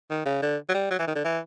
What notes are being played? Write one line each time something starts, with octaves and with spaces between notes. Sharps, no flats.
D#3
C#3
D3
F#3
G3
F#3
E3
D#3
D3
E3